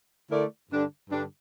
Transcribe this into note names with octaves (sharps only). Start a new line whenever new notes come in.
D3 A3 E4 A#4 D5
G2 D3 G3 D4
G2 D3 G3 D4